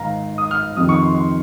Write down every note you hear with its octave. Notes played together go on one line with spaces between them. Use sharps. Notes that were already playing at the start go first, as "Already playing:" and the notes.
Already playing: G#2 D#3 F5 A#5
D#6
F6
F2 C3 D#3 D#6
C#6
C6
C6